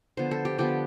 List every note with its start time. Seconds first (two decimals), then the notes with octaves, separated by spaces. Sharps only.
0.17 D3 F3 B3 C5
0.31 A4
0.45 G4
0.58 D3 F3 B3 G4